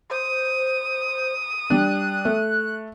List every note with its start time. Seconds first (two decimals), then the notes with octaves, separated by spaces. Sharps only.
0.11 C5 D#6
1.70 G3 D4 F#6
2.25 A3